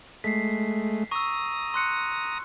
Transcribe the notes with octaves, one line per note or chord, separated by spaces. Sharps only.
G#3 A3 B6 C7
A#5 C#6 D#6 E6
C6 F#6 C#7